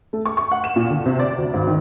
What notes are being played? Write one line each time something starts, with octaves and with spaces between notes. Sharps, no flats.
A3
C#6
C#6
F#5
E7
A#2
D3
C3
D5
D2
G#1
D#3